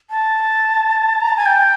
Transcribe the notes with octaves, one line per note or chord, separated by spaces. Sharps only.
A5
A#5
A5
G#5
G5